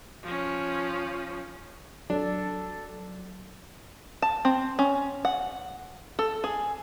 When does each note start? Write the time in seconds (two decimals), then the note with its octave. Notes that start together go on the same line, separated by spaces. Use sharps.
0.22 F3 C#4
2.10 F#3 D4 A4
4.22 A5
4.45 C4
4.79 C#4
5.25 F#5
6.19 A4
6.44 G#4